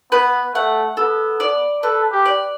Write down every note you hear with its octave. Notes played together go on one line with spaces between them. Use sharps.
B3 B4
A3 F#5
B3 A4
D5
A4 B4
G4
D5